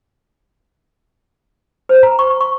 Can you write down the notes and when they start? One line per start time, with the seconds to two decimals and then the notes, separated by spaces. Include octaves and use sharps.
1.89 C5
2.03 A#5
2.19 C#6
2.41 C#6